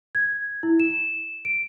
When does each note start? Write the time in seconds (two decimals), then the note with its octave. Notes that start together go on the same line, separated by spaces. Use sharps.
0.15 G#6
0.63 E4
0.80 E7
1.45 D7